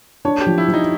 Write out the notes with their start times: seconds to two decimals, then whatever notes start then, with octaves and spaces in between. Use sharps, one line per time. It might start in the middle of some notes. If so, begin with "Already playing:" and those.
0.25 D4 C#5
0.41 G4
0.46 F3
0.58 E4
0.68 F3
0.74 D#4